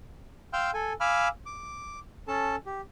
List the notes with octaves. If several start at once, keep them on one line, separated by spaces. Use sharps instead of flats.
F5 G5 C6 E6 F6 G6
A4 G#5
F5 G#5 B5 D6 E6 F6
D6
C#4 A4 A5
G4